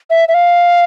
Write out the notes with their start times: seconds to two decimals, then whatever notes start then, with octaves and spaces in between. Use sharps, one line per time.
0.10 E5
0.28 E5
0.34 F5